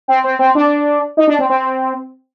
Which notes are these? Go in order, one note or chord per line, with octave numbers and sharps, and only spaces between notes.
C4
C4
C4
D4
D#4
D4
C4
C4